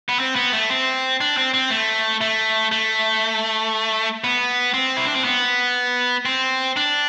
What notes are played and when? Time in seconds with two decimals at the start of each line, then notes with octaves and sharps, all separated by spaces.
0.09 B3
0.20 C4
0.36 B3
0.53 A3
0.70 C4
1.21 D4
1.37 C4
1.54 C4
1.70 A3
2.21 A3
2.72 A3
4.24 B3
4.74 C4
4.97 E4
5.07 D4
5.16 C4
5.24 B3
6.25 C4
6.77 D4